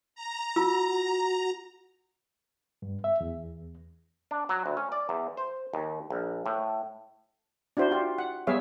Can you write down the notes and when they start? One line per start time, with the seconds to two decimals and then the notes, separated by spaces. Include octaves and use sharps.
0.15 A#5
0.56 F4 F#4 E6
2.82 G2
3.04 E5
3.20 E2
4.31 D4
4.49 F#3
4.66 D2
4.77 C#4
4.92 D5
5.09 E2
5.37 C5
5.73 D#2
6.10 A#1
6.46 A2
7.77 D4 E4 F#4 C5
7.91 F4 G4
8.18 F#5
8.47 G3 B3 G#4 C#5 E5 F5